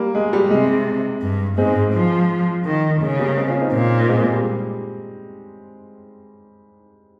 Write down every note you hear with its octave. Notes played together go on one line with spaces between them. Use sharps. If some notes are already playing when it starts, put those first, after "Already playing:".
Already playing: G3 A#3
G#3
G3
C3 G#3
G2
G#2 G#3 C4
F3
D#3
C#3 G#3
G3 A#3
G#3 C4
C#4 F4
C4 D#4
A#2
G#3 C4
G#3
G3